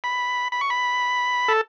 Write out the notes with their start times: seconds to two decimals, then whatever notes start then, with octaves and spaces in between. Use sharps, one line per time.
0.04 B5
0.52 B5
0.61 C#6
0.70 B5
1.48 A4